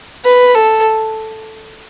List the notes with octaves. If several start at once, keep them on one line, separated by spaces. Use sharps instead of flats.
B4
A4